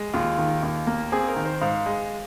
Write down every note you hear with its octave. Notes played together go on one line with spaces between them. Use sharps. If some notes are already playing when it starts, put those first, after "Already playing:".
Already playing: G#3
D#2 F4
D#3
D#2
A#3
C4 G#4
A#4
D#3
C5
G#2 F5
G#3